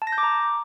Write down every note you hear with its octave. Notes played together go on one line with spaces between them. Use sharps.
A5
A#6
G6
D6
A#5